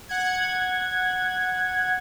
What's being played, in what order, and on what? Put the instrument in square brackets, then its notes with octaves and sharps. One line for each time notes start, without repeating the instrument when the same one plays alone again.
[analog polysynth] F#5 G#6